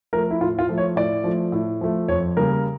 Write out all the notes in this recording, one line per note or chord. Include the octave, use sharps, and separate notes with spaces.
F3 A3 A#4
E4
A2 F4
F4
F3 A3
C#5
A2 D5
F3 A3
A2
F3 A3
F2 C#5
C#3 G3 A#3 A#4